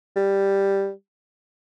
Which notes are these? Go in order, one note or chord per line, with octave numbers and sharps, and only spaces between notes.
G3